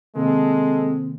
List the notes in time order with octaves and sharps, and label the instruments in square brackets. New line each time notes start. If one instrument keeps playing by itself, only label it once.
[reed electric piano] C3 D#3 A#3 [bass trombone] G#3 [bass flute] C4 [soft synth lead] A4